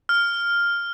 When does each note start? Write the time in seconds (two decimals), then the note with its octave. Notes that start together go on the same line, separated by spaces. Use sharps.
0.09 F6